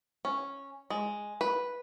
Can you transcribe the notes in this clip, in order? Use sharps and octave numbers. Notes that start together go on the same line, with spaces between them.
C#4
G#3
B4